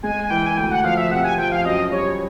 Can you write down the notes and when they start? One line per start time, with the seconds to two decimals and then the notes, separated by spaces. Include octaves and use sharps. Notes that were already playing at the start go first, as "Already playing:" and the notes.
0.03 G#3 G#5
0.24 G#5
0.30 E3 G5
0.46 G#5
0.57 D2 G5
0.71 F#5
0.84 F3 F5
0.97 E5
1.11 C3 F#5
1.24 G#5
1.38 F3 G5
1.52 F5
1.65 F#2 D#5
1.92 G3 C#5